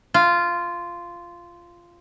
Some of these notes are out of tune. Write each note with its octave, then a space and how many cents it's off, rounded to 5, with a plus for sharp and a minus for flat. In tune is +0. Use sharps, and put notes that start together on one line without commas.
F4 -10